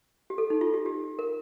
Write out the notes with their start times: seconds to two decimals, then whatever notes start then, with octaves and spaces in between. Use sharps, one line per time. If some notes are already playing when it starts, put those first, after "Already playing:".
0.30 G4
0.38 A4
0.50 D#4
0.61 F4
0.74 G4
0.86 G4
1.19 A#4